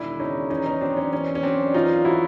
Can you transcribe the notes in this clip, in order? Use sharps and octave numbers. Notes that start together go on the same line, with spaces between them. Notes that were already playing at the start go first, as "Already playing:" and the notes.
Already playing: E1 D#3 D4 E4
C#3 C#4 D#4
E2 C#4 D#4
C#4 D#4
F#3 C4 D4
C#4
E2 C#4
C#4
F#3 C4 D4
E2 D#4 F4
F#3 E4 F#4